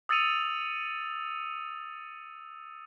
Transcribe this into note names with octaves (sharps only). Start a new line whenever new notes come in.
D#6 E6 A6 C#7 D#7 F7